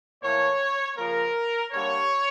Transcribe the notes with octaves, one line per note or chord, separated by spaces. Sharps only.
A2 E3 A#3 C#5
C#3 F3 A#3 A#4
D3 G3 A#3 C#5